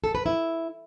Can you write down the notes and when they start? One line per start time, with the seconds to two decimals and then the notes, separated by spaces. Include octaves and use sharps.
0.04 A4
0.15 B4
0.26 E4